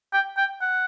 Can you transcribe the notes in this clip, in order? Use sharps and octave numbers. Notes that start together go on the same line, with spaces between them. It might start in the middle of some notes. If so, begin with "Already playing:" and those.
G5
G5
F#5